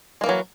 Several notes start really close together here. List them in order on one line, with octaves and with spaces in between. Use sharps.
G#3 A#3 E3 F#3